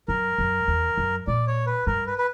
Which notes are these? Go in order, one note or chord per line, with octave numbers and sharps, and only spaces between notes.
F#2 A#4
F#2
E2
F#2
A#2 D5
C#5
B4
G2 A#4
B4
B4